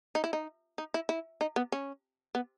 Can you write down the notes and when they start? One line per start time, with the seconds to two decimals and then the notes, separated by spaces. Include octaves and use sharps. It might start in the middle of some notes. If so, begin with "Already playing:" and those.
0.15 D#4
0.24 E4
0.33 D#4
0.78 D#4
0.94 E4
1.09 E4
1.41 D#4
1.56 B3
1.72 C#4
2.35 B3